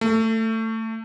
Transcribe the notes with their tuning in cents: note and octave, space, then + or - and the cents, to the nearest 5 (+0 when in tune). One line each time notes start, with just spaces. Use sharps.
A3 +20